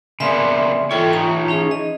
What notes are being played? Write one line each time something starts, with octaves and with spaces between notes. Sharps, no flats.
C#3 A#3 B3 D5 E5 C6
E3 E4 F4 A4 C#5 G5
D#4 F4 A#5
C#4 D#4 G#4
D#5